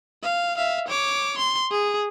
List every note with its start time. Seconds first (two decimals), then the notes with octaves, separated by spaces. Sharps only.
0.23 F5
0.57 E5 F5
0.88 C#5 D6
1.38 C6
1.71 G#4